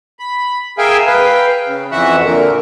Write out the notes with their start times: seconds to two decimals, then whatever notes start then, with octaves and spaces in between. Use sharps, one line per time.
0.19 B5
0.78 G#4 A#4 E5 F5 G5 G#5
1.07 B4 F5 G5
1.66 C#3
1.92 F2 E3 F#4 E5 F#5
2.25 A#2 D3 A#4